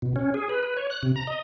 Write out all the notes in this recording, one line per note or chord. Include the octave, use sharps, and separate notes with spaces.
B2
C#4
G#4
B4
B4
C#5
F#6
C3
A#5
D#5